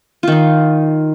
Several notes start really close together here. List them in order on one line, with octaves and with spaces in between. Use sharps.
F4 D#3 D#4